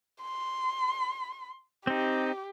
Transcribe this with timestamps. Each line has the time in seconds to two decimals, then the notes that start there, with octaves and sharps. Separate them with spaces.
0.22 C6
1.87 C4 D#4 G4